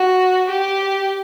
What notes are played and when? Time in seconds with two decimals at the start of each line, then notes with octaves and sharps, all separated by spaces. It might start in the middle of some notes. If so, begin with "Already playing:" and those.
Already playing: F#4
0.50 G4